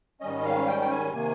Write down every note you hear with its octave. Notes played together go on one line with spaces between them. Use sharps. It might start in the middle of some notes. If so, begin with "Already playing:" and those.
G#2 D#3 G3 C#4 D#5
F5
G5
G5
G#5
C3 D#3 A#3 G#5